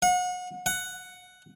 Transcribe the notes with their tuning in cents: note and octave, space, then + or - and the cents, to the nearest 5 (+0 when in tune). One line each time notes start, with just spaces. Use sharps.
F#5 -35
F#5 +5